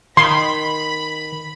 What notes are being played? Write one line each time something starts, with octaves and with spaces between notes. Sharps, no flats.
D#3 B5 C6